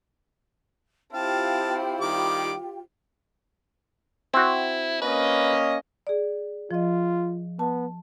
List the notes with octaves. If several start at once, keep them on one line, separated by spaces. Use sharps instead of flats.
C4 E4 F4 G4 F5 G5 A5
D#3 G3 D6
C4 E4 F#4
A#3 C#4 B4 D#5
G#4 D5
F3 F4 D#5
B3 A5